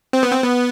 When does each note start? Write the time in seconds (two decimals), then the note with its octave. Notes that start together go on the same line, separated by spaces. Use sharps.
0.13 C4
0.23 B3
0.32 C4
0.43 B3